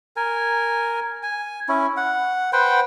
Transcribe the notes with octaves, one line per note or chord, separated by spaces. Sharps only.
A#4 G#5
G#5
C#4 E4
F#5
B4 C5 F#5 G5